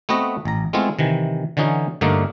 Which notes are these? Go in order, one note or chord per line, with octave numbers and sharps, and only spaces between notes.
A3 B3 C4 F#4 B4 D#5
A1 A#5
G#3 A3 B3 C4 E4 F4
C3 D#3 E3
D3 E3 C#4 D#4 F#4
G2 D3 A3 A#3 D4 D#4